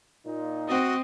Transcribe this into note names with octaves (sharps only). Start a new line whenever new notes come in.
A#2 D#4
C4 F#4 D#5